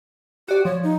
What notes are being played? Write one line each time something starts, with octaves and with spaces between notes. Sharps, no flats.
F#4 G4 D5
F3 C#5
D#4